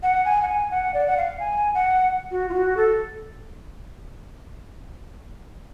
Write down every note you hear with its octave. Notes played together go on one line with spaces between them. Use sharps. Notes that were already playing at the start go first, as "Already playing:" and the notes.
F#5
G#5
F#5
G#5
F#5
D5
F#5
F5
G#5
F#5
F#4
F4
F#4
A4